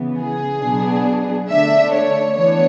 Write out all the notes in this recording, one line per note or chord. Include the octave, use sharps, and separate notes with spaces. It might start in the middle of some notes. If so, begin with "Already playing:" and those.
Already playing: C#3 E3 B3
G#4
B2 F#3 B3 D4
D3 A3 D4 E5
C#5
E3 B3 D4 C#5